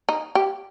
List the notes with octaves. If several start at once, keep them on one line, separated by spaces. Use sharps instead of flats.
D#4
G4